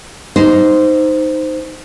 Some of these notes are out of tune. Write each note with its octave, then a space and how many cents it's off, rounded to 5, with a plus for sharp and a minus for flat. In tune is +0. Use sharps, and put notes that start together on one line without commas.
D#4 +0 C5 -10